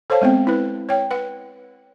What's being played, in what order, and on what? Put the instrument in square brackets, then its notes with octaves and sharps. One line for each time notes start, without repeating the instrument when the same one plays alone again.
[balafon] A4 C5 C#5 F5 A5
G#3 B3 C4 G5
E4 B4
C#5 G5
B4 F#5